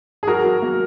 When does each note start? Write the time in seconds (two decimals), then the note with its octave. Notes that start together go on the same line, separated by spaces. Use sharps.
0.23 G#4
0.27 F#3 F#4 A#4
0.45 F#3
0.62 A#3